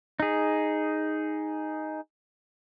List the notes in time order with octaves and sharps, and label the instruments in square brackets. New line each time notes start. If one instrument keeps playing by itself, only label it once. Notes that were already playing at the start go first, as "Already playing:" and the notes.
[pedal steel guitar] D#4 G#4